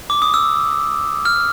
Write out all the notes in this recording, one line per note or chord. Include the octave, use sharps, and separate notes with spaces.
D6
D#6
E6
F6